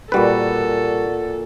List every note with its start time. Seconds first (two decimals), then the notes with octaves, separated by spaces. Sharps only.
0.12 A#2 G3 F#4 A4 B4 D#5